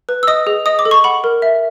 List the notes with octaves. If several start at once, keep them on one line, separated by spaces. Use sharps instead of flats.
B4
E6
D#5 D#6
G#4
D#5 D#6
D6
A4
C#6
F#5 B5
A#4
E5